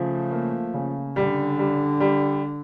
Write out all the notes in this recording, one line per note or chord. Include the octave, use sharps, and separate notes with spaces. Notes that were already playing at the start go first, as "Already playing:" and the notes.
Already playing: C#3 F3 A3
A#3
C#3
D3 G3
G3
G3